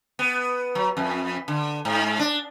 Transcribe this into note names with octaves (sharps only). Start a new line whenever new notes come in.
B3
F#3
F2
D3
G#2
D4